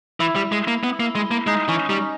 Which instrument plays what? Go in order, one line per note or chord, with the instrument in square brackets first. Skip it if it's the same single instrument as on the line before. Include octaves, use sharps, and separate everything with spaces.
[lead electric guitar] E3 [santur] E4
[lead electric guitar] G3
G#3
A#3
B3
A#3
G#3
A#3
[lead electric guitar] G#3 [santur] D#4
[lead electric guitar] E3 [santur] C#4
[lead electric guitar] G3 [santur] D#4